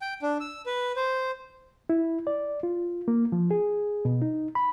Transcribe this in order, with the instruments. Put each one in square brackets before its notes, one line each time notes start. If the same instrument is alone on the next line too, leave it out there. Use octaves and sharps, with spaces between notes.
[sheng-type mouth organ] G5
D4
E6
B4
C5
[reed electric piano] E4
D5
F4
A#3
F3
G#4
B2
D#4
B5